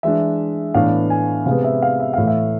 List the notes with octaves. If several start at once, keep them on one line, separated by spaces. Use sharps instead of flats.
E3 G#3 D4 E5
A2 E3 B3 D4 F5
G#5
C3 G#3 B3 F5
E5
F5
E5
A2 E3 A3 F5
E5